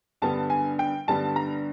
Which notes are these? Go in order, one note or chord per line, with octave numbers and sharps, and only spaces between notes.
G2 D3 G3 B3 A5
G#5
G5
G2 D3 G3 B3 A5
A#5